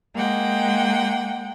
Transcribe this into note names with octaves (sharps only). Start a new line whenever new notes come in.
G#3 A#3 F#5 G5